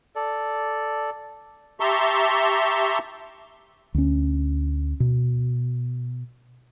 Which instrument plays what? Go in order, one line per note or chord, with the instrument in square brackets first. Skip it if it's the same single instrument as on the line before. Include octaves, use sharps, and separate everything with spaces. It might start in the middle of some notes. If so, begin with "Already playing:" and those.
[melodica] A4 D5
[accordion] G4 E5 A5 A#5 C6 C#6
[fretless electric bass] D2 C#4
B2